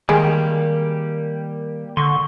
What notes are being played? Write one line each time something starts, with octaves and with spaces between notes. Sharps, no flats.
D#3 G3 G#3 A#3 G4
D3 C6 C#6